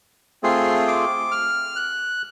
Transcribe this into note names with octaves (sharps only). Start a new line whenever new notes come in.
A3 C4 F4 G#4 C6
D6
F6
F#6